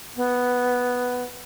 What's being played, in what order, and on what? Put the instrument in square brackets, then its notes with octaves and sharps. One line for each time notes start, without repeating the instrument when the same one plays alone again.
[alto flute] B3